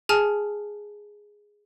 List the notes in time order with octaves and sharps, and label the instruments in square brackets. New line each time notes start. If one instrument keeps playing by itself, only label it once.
[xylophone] G#4 G#5 A5 F6